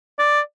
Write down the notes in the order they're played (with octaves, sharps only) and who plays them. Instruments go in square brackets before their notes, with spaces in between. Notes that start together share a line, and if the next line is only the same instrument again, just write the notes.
[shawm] D5